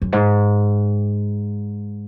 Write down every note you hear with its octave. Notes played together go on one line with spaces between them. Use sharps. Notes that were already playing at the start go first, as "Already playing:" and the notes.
F#2
G#2